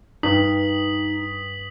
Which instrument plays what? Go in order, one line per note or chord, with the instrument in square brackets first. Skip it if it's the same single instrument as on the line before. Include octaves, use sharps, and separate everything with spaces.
[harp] G2 [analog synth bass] D#4 [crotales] D#6 B6 F#7